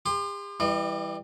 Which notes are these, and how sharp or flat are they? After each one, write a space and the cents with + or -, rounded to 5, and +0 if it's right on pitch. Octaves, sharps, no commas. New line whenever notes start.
G4 +45 C6 +0
E3 +0 G3 +15 D#5 -45